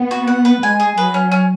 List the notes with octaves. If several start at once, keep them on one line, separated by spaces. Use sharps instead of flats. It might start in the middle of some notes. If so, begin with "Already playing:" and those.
Already playing: B3
F#4
F#5
B4
G#3 G#5
G#4
F#3 B4
C#4
C#4